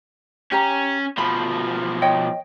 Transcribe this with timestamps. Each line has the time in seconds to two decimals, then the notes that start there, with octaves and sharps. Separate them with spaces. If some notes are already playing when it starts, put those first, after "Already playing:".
0.52 C#4 G4 A#5
1.18 B2 F3 B5
2.02 C#5 D#5 G5